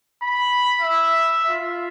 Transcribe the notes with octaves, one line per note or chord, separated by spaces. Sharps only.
B5
E5
F4